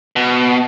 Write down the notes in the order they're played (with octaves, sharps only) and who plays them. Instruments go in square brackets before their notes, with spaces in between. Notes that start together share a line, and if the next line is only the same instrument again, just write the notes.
[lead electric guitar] B2